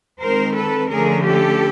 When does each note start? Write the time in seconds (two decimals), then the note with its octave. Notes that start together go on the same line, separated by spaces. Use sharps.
0.20 D#3 G#3 C4 A#4 C5
0.56 A4 B4
0.90 D3 F3 A3 C#4 G#4 A#4
1.26 G4 A4